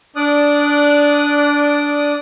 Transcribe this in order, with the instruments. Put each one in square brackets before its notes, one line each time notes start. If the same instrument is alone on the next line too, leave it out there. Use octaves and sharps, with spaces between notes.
[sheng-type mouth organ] D4 D5 D#6 F#6